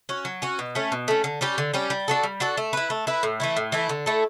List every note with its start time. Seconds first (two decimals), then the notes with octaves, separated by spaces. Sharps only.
0.09 C#4 F#4
0.25 F#3
0.42 C#4 F#4
0.59 B2
0.75 A3 C#4
0.92 B2
1.08 A3 C#4
1.24 D3
1.41 G3 C#4 G4
1.58 D3
1.74 G3 C#4 G4
1.90 G3
2.08 D4 F#4 A4
2.23 G3
2.40 D4 F#4 A4
2.57 A3
2.73 E4 B4
2.90 A3
3.07 E4 B4
3.23 A2
3.40 E3 A3 E4
3.57 A2
3.72 E3 A3 E4
3.89 D3
4.06 A3 E4 A4